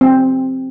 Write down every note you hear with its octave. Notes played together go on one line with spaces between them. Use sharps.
C4